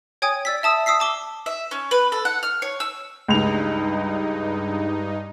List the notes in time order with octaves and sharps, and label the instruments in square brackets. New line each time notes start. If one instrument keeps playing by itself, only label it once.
[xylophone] C#5 G5 G#5 D#6 G#6
D5 E6 B6
E5 A5 D#6 E6
G5 D#6 E6 B6 C7
A5 D6 G7
[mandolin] E5
C#4
B4
A4
F#5
F6
C#5
E6
[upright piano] C#2 F7 [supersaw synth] G2 D#4